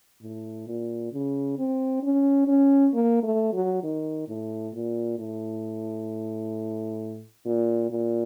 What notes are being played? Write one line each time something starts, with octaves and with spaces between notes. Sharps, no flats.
A2
A#2
C#3
C4
C#4
C#4
A#3
A3
F#3
D#3
A2
A#2
A2
A#2
A#2